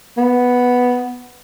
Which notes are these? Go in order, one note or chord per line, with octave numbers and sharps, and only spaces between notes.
B3